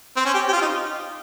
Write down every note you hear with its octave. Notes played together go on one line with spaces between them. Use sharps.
C4
C#4
G4
G4
F4
D#4